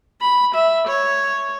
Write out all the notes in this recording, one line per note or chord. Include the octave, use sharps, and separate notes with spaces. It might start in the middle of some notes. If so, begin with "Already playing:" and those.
B5
E5
C#5